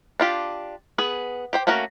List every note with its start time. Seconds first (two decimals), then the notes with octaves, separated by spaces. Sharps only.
0.20 D4 F4 G4
0.98 B3 G#4 B4
1.53 G4 C5 G5
1.67 A3 A#3 C#4 F#4 A#4